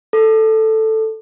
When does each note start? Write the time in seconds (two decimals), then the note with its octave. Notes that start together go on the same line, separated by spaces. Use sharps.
0.13 A4